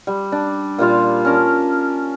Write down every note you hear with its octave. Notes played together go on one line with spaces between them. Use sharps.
G3
D4
A#2 G3 F4 F5
C#4 A#4 A5